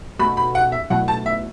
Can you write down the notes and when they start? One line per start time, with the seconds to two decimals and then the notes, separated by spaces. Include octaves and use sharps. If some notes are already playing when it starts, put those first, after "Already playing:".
0.19 B2 A3 F#4 B5
0.37 B5
0.55 F#5
0.72 E5
0.90 B2 F#3 A3 E4 F#5
1.08 A5
1.26 E5